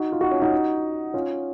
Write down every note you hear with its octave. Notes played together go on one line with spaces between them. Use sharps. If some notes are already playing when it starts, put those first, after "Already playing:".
Already playing: D#4 F#4
F4
D#4 F#4
C#4 F4
D#4 F#4
C#4 F4